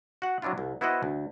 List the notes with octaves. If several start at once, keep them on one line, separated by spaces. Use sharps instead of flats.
F#4 F#5
F#3 C4 D4 E4 F4
C2
B3 E4 F#4 C5 D#5 F#5
D2